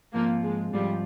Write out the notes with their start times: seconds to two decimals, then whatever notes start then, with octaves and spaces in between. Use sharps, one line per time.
0.13 G#2 F3 A#3 C4 F4
0.43 G#3
0.73 G#2 F3 G3 C4 F4